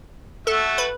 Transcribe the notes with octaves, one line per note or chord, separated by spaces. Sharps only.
A3 F#4 A4 E5
B4